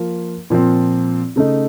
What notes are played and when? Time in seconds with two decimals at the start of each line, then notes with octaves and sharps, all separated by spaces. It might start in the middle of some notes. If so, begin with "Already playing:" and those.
Already playing: F3 A#3 F4
0.50 A#2 F3 C4
1.36 C#3 A3 D#4